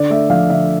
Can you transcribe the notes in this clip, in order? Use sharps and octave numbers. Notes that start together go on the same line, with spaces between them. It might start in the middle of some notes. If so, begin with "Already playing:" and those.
Already playing: D3 D5
A3 E5
F3 F5
D3 E5